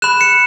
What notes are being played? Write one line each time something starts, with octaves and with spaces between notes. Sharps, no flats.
B5 F#6 E7
C#7